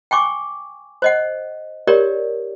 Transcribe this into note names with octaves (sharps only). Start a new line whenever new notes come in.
G5 G#5 C#6 D6
C5 D#5 F#5
G4 A#4 C#5 D5